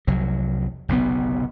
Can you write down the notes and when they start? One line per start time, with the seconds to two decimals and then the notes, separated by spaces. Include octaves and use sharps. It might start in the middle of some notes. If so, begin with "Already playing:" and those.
0.07 F1 C2 F#3
0.88 F#1 B1 C3 B3